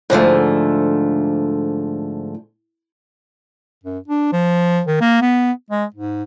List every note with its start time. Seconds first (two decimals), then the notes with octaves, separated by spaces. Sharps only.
0.10 G#2 D3 F3 A3
3.83 F#2
4.08 D4
4.32 F3
4.86 D#3
5.01 A#3
5.21 B3
5.70 G#3
5.94 G#2